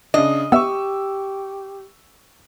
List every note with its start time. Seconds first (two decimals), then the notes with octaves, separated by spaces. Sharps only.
0.14 C#3 D4 D#5
0.52 B3 G4 E5 C#6 E6